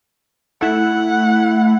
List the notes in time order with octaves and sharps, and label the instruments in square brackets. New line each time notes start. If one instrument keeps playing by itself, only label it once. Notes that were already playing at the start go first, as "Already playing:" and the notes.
[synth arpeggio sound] A3 E4 [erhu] F#5